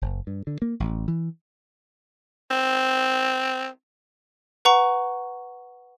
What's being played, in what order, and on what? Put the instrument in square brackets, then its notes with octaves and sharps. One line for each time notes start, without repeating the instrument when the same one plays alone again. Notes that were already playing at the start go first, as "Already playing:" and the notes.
[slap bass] F#1
G2
D3
A#3
A1
E3
[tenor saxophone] C4
[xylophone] B4 F#5 A#5 C#6